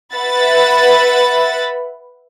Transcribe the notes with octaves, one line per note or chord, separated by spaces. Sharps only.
B4 E5 F#5 B5 A6